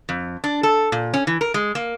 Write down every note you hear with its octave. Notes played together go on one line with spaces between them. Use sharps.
F2
D4
A4
A#2
C#4
E3
A#4
G#3
A#3